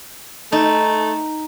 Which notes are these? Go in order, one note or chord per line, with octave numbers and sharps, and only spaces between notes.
A3 D#4